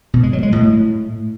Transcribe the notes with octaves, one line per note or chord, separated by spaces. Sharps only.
B2
G#3
F#3
G#3
A2